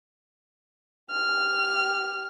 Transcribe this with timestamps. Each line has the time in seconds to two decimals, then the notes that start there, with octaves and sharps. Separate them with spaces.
1.11 G4 F6